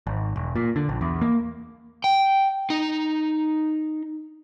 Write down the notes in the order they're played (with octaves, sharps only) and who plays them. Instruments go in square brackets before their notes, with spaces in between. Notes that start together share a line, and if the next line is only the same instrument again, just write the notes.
[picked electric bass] G#1
E1
A#2
D3
A#1
E2
A#3
[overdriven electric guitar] G5
D#4